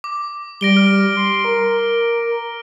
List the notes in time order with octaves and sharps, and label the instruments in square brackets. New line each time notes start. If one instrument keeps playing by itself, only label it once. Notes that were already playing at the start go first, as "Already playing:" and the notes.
[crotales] D6
[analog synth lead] G3 [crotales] A#6 D7 G7
[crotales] F6
[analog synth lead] C6
A#4